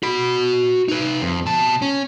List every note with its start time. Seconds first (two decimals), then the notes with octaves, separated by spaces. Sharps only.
0.03 F#4 B5
0.88 D#4 B4
1.22 F2
1.46 B2 A5
1.82 C#4